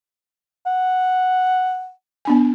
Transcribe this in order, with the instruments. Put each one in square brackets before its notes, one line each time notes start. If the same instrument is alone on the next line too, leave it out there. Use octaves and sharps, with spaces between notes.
[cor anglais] F#5
[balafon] B3 D4 G#5